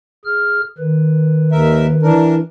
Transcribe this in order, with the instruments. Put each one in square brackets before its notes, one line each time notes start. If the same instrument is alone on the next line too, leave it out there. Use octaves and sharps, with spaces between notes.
[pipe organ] G#4 F6
D#3 B4
[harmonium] D#2 A#4 E5
E3 D4 A#4